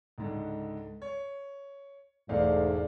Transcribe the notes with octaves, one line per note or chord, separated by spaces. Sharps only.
C#2 G#2 D3
C#5
E1 E2 G#2 A3 D5 F5